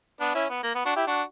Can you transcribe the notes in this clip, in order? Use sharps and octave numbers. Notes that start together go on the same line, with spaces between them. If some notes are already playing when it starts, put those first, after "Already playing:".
B3 D4
C#4 E4
B3
A#3
B3
D4 F#4
E4 G4
D4 F#4